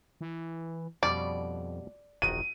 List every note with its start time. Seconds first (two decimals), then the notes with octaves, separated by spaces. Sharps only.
0.21 E3
1.03 F2 B2 G3 C#4 D5
2.22 E1 A#1 D#3 F#4 D#7